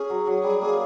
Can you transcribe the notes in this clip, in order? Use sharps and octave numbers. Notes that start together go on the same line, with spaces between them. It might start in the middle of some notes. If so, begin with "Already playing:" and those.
Already playing: C#4 G#4
F#3
F#3
G3
A#3